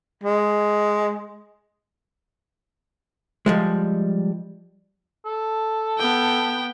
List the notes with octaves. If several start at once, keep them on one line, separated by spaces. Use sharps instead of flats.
G#3
F3 G3 G#3
A4
B3 G5